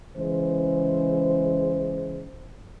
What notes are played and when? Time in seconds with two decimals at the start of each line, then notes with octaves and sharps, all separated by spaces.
0.16 C#3 E3 G#3 C5